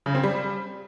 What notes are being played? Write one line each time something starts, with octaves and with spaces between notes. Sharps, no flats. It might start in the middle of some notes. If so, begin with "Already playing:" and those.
C#3
C4
G3